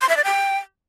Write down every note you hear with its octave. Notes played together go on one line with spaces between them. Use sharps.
C6
E5
D5
G5